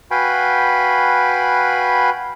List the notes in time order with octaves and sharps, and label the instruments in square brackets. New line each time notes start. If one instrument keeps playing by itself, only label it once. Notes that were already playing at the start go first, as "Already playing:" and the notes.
[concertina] F#4 B4 F5 G5 G#5 B5